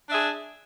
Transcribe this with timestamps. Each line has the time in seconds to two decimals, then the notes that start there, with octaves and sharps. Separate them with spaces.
0.07 D4
0.10 E5
0.13 G#4